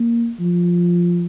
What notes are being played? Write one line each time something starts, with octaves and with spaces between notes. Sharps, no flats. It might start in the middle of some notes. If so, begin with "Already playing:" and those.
Already playing: A#3
F3